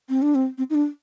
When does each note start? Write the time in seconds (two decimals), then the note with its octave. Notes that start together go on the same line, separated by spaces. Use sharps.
0.09 C4
0.22 D4
0.35 C4
0.58 C4
0.70 D#4
0.75 D4